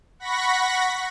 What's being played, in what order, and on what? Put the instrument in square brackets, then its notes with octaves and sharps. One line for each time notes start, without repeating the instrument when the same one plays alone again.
[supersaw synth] F#5 B5 C#6 A#6 B6